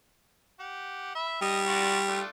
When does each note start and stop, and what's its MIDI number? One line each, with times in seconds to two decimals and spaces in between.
0.60 1.13 67
0.60 1.13 78
1.15 1.39 76
1.15 1.39 83
1.42 2.21 55
1.42 1.60 75
1.67 2.00 65
1.67 2.00 66
1.67 2.00 74
2.08 2.28 57
2.08 2.28 62
2.08 2.28 65